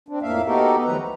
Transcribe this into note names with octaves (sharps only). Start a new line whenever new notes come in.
C4 D4
F2 A2 A#3 E5 F5
B3 D#4 F#4 G4 A4 A#4
D#3 F3 F#3 A3 B4 A#5
D2